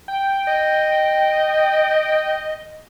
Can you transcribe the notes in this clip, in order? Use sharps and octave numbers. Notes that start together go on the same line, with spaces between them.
G5
D#5